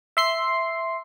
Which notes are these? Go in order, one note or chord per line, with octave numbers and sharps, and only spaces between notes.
E5 C6 C7